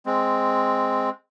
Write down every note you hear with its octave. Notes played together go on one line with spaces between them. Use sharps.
G#3 C4